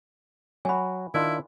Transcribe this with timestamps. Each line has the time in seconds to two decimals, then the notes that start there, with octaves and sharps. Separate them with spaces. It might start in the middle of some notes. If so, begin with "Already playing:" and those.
0.65 F#3 F#4 G#5 B5
1.14 D#3 D4 E4 F4